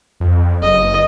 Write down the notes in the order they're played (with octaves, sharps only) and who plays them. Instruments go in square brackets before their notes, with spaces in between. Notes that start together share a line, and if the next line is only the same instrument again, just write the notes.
[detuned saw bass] F2
[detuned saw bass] F#1 [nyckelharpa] D#5